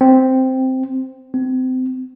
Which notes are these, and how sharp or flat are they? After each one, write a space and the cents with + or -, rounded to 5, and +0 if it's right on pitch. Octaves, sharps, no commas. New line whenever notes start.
C4 -5
C4 -30